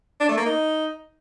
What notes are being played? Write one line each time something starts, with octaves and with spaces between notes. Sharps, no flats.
D4
A3
A#3
D#4